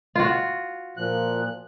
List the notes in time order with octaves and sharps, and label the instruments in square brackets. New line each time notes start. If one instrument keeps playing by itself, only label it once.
[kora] F4 F#4
[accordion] A#2 F3 F#6